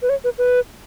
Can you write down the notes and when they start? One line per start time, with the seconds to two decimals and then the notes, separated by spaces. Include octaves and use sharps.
0.02 B4
0.09 C#5
0.24 B4
0.38 B4